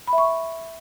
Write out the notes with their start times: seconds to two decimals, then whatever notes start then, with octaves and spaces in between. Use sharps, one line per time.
0.07 B5
0.13 E5
0.18 C#6